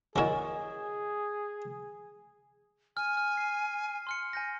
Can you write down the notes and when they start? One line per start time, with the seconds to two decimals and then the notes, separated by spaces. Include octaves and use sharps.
0.16 F#3 E4 F#4 G#4 A#4 C#5 D#5 G#5
2.97 G#5 F6
3.17 F6
3.37 C7
4.07 C6 F6 C#7
4.33 G#5 G6 A#6